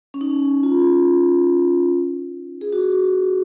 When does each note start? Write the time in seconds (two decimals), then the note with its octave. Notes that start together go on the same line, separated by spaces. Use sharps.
0.14 C#4
0.21 D#4
0.63 F4
2.61 G#4
2.73 F#4